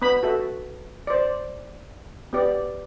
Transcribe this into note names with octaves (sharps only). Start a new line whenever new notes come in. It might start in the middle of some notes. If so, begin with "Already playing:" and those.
B3 B5
F#4 A4 E5
C5 D5
B3 G4 D5